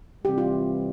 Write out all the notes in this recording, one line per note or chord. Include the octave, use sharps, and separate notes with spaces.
C3 E3 G3 G4
F4